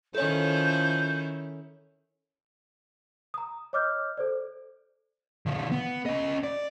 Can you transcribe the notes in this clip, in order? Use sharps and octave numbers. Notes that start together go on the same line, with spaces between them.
D#3 F3 C#4 E4 A4 C#5 G6
A#5 D#6
C#5 D#5 D6 E6 F6 G6
A4 C5 D5
D3 F3
B3
C#4 D#5
D5